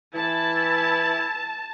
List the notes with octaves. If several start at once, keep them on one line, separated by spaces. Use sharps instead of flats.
E3 E4 A5